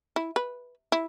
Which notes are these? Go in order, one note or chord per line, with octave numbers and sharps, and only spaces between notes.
E4
B4
E4